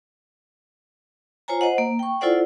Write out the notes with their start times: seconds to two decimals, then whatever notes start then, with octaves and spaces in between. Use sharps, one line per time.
1.48 F4 C5 C#5 G#5 A#5
1.61 C5 D#5 F#5
1.78 A#3
1.99 G5 C#6
2.21 E4 F4 A4 C5 D5 F#5